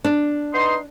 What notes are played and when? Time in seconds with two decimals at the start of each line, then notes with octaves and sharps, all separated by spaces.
0.04 D4
0.54 B3 D#4 C6